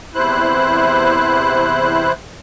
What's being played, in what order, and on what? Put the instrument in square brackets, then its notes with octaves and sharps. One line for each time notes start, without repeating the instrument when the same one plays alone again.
[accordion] E2 C3 E4 C5 F#6